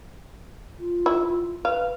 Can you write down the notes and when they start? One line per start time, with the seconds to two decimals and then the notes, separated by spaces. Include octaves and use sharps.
0.79 F4
1.06 E4
1.65 B4 F5